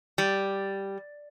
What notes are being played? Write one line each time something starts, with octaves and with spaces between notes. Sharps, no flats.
G3